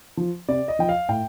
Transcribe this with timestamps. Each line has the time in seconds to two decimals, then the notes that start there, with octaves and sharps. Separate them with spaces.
0.17 F3
0.48 C3 D5
0.68 D#5
0.79 F3 G5
0.89 F5
1.09 A2 G5